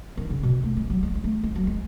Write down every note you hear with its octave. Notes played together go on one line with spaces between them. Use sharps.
D#3
C#3
B2
A3
G#3
F#3
G#3
G#3
A3
G#3
F#3
G#3